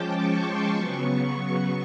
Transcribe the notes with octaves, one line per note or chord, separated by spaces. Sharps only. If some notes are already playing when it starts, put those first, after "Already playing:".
Already playing: F3 G#3 C#4 G5 A5 D6
C#6
C6
C#3 F#3 B3 C#6